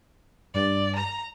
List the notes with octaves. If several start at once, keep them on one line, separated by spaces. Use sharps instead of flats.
G2 D5
A#5